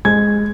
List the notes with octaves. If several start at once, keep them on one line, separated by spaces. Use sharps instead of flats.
G#3 G#6